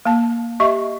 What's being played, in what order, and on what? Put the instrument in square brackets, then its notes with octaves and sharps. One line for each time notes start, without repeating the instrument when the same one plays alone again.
[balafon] A#3 A5
G4 D#5 E5 C#6